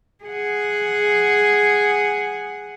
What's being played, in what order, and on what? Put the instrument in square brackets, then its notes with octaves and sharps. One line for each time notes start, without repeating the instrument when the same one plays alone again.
[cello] G#4 F#5